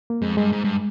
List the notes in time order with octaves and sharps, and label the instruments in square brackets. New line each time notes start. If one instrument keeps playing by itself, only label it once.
[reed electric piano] A#3
[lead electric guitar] F2 [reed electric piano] G#3
[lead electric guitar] G2 [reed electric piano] G#3
[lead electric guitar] G#2
G2